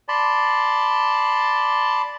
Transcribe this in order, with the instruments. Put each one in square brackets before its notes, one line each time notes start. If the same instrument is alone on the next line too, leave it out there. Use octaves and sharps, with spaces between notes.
[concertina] D5 A5 B5 C6